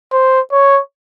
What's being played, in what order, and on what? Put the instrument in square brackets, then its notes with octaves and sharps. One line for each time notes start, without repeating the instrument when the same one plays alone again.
[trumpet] C5
C#5